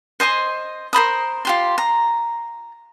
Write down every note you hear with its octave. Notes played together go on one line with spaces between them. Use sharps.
C5 D#5 G#5 C6
A#4 C5 B5 D#6
F4 G4 C6
A#5